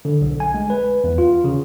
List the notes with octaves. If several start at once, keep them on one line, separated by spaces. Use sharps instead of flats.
D3
B1
G#5
G#3
B4
E2
F4
C#3